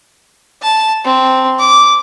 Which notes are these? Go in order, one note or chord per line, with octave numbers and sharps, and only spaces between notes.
A5
C4
D6